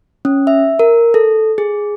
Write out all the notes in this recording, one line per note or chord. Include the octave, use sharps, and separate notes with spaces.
C#4
E5
A#4
A4
G#4